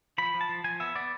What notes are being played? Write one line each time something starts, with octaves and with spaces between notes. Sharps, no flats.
F3 B5
F3
A5
F3
F3 G#5
B3 E5
B3 D5